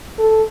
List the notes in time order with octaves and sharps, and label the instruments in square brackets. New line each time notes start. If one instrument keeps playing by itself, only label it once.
[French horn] A4